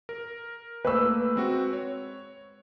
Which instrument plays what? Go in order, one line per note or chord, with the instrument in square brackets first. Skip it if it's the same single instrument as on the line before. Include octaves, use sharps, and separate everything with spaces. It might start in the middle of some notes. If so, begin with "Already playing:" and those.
[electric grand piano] A#4
[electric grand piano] A3 A#3 [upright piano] B4 E6
[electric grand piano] G#3 C4 F#4
C#5